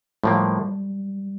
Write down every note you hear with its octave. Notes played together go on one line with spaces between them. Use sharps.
A2 F3 G3 A#3